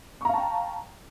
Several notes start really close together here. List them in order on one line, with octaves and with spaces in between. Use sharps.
C#6 A#5 F5 A5 G5